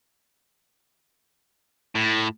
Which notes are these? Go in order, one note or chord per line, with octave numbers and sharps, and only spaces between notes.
A2